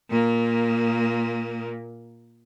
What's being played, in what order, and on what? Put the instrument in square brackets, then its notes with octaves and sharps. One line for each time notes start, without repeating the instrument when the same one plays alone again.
[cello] A#2 A#3